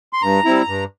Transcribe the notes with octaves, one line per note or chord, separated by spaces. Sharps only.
C6
G2 A#5
G3 C4 E4
G2